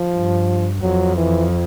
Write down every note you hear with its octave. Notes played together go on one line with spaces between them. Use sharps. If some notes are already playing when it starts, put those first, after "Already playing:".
Already playing: F3
G2
F2 F#3
E3